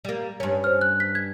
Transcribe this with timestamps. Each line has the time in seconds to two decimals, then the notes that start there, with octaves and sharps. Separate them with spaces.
0.05 G3 A#3
0.40 G2 C#4
0.64 C5 F6
0.81 F#6
1.00 B6
1.15 G#6